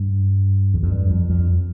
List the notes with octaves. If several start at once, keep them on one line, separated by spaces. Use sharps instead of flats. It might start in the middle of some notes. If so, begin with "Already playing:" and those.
Already playing: G2
E2
F2
G2
F2
F2